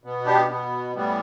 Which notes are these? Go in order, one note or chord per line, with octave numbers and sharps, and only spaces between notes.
B2 B3
D4 G4
B2 B3
A2 E3 G3 B3